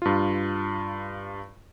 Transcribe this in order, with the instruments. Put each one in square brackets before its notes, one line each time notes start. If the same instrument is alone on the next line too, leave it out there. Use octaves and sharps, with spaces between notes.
[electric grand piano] G2 F4